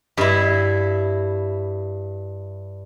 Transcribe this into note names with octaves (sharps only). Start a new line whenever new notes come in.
G2 E4